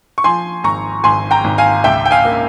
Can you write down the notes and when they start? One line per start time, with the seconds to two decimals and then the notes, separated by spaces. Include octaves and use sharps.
0.18 C#6
0.24 F3 G#5 C6
0.64 G#1 A#5 C#6
1.04 G#1 G#5 C6
1.31 G5 A#5
1.44 G#1
1.58 F5 G#5
1.84 C#2 E5 G5
2.06 G5
2.11 F5 G#5
2.25 A#3